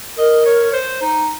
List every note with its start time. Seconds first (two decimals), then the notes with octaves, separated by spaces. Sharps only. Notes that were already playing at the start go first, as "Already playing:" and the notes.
0.18 A#4 D#5
0.46 C#5
0.74 C5
1.01 D#4